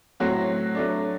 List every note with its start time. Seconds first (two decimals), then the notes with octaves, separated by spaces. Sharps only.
0.20 A2 F#3 C4 F#4
0.75 F#3 A3 D4